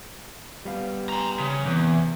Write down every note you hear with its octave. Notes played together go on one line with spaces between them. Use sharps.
G3 B3 F5
A#5 C6
C#3
E2 C3 E3 B3